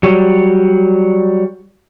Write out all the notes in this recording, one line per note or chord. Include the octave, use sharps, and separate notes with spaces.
F#3 G3